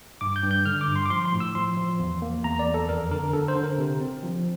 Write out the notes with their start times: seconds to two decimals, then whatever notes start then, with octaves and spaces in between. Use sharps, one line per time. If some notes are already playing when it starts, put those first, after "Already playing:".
0.21 G2 D6
0.36 G6
0.43 G2
0.51 G6
0.66 D3 F6
0.81 D6
0.88 G2
0.96 C6
1.06 D6
1.10 F3 C6
1.25 C6
1.33 A2
1.40 E6
1.55 F3 C6
1.77 F3
1.99 E2
2.22 A#3
2.44 E2 A#5
2.59 D5
2.67 E2
2.74 A4
2.89 F2 A#4
3.11 D3 A#4
3.33 D3 A4
3.48 C5
3.56 D3
3.64 A#4
3.78 C3
4.01 C4
4.23 F3